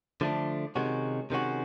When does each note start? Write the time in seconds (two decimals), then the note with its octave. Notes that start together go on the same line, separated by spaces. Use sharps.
0.21 D3 F3 A3 D4
0.75 C3 D#3 G#3 C#4 F#4
1.30 C3 D#3 G#3 C#4 F#4